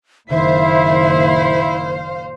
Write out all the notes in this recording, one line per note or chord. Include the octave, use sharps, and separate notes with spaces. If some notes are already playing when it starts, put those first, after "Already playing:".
F#1 A#2 D#3 E4 C5 E5 F5